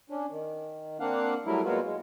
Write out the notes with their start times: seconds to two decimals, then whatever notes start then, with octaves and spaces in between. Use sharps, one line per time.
0.10 C#4 D4
0.31 D#3
1.00 A#3 C4 D4 F5 F#5
1.46 F#3 G3 A3 E4 A#4
1.65 A#2 F#3 G#3 B3 F4 F#4
1.84 G#3